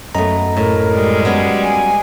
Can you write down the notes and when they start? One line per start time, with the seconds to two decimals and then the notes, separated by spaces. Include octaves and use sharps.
0.15 F#2 A3 B3 D#5 A#5
0.57 A2 A#4
0.93 G3 G#3
1.25 F#3 B3 C#4
1.63 G#5